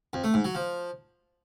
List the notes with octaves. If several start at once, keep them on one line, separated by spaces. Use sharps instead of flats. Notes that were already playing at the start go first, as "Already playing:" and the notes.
F2
A3
G#2
F#3
F3